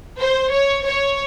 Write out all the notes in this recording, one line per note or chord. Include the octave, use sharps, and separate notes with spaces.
C5
C#5
C#5